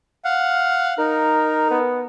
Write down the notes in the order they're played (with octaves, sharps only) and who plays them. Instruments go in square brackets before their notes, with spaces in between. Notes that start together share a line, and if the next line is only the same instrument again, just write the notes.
[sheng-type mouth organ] F5 F#5
[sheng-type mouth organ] D#4 [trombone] A#4
[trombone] B3